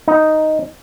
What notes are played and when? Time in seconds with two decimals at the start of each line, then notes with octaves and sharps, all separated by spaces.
0.08 D#4